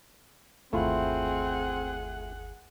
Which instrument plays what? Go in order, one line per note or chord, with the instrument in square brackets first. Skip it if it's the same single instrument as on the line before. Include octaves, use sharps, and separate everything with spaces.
[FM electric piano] G1 D#2 [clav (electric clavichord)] A3 E4 F4 [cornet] C4 [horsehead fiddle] G#4 F#5